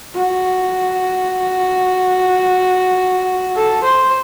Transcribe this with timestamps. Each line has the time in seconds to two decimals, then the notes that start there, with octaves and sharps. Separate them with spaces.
0.15 F#4
3.56 A4
3.84 C5